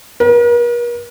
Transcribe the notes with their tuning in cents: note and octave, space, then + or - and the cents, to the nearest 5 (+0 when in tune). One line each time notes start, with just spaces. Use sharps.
A#4 +45